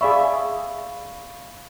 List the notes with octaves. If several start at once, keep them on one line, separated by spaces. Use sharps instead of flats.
G#4 D5 E5 F5 B5 C#6